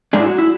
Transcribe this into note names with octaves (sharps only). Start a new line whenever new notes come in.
G#2 G#3 D4 G#4
E4
F#4
E4